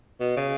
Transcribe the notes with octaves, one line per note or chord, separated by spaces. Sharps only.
B2
C#3